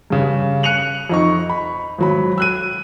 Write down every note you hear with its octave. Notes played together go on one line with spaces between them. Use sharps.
G2 C#3
F#6 C#7 D#7 F7 F#7
F2 D#4 C#6
B5
G#1 F#3 B5
E6 F#6 D#7